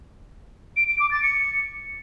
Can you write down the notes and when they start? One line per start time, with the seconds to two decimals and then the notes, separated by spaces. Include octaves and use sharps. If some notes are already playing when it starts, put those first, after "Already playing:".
0.77 D7
0.88 D7
1.00 D6
1.11 A6
1.23 C#7